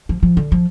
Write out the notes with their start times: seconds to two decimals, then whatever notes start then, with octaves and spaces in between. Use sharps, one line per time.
0.09 F3
0.23 F3
0.37 D3
0.52 F3